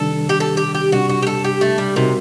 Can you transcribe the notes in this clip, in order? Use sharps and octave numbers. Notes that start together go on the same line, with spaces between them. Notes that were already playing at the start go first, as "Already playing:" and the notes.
Already playing: C3 D#3 G3 D4 A4
G4
A4
G4
G4
C3 G3 D4 F#4
F#4
G4
A4
G4
A3
G3
C3 G3 C4 D#4 F#4 A#4